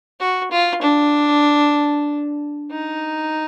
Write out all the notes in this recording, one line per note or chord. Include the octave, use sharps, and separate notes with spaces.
F#4
F4
D4
D#4